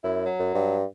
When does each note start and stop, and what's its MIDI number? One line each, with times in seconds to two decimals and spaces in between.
0.04 0.28 42
0.04 0.21 64
0.25 0.76 54
0.39 0.53 42
0.54 0.84 43